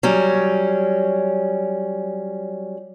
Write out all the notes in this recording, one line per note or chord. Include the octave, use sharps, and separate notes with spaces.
F#3 G3 C#4